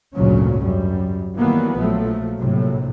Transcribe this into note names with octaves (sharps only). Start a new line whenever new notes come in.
G#1 D2 A#2 C#3 F#3 C#4
F#2 G3
D#3 E3 F#3 G3 A#3 B3
A#1 F3 F#3 A3
A#1 A2 C3 F#3